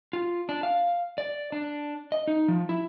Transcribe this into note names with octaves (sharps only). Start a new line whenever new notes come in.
F4
D4
F5
D5
D4
D#5
D#4
F3
E4